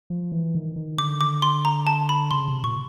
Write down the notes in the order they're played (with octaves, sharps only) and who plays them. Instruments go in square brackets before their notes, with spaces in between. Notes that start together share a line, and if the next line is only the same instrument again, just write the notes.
[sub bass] F3
E3
D#3
D#3
[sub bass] D3 [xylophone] D6
[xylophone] D6
C6
A#5
A5
B5
[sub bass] C#3 [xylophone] C6
[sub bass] C3
[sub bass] A#2 [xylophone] C#6